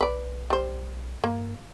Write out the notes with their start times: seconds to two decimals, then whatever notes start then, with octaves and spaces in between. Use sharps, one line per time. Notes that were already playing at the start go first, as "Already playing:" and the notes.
0.01 B1 B4 D5
0.50 G3 C5
1.24 G2 A#3